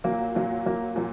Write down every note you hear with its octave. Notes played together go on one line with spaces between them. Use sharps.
A#2 F#3 A#3
A#2 F#3 A#3
A#2 F#3 A#3
A#2 F#3 A#3